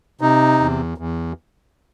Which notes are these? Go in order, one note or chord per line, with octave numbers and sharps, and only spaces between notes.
C3 D#4
E2
E2